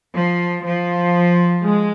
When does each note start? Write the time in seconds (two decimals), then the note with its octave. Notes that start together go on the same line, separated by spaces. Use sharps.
0.14 F3
0.64 F3
1.64 G#3